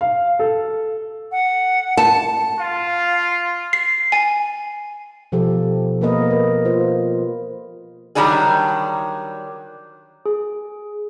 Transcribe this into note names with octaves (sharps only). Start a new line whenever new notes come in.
F5
A4
F#5
A5
F4 F5
C7
G#5
B2 F3 G4 A4
A#3 B3 A#4 B4 D#5
B4
F4 C5
D#3 F#3 G3 D4 G#4
G#4